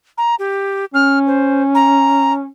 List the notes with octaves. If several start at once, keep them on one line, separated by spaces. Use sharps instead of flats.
A#5
G4
C#4 F6
C5
A#5